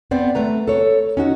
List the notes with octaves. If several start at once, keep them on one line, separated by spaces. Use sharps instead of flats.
B3 C4 D5
A3 B4 A#5
A4 C#5
C#4 D#4 F#4